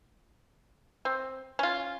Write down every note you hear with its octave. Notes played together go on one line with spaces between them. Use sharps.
C4
C#4 F4